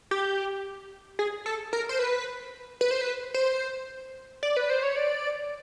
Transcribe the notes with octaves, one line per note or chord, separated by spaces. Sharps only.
G4
G#4
A4
A#4
C5
B4
B4
C5
B4
C5
D5
B4
C5
C#5
D5